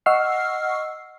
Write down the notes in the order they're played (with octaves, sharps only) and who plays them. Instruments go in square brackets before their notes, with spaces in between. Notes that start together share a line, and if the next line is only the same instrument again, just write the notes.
[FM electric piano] D#5 F#5 C#6 E6 F6 C7